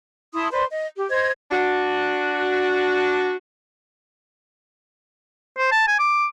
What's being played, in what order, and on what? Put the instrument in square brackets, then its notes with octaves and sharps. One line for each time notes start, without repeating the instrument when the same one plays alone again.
[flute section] E4 A5 C6 D#6
B4 C5 D5 C6
D#5
G4
C5 D#5 G#6
[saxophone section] D4 F#4
[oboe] C5
A5
G#5
D6